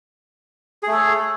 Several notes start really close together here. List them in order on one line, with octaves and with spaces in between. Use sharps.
G#4 A3 A4 C#5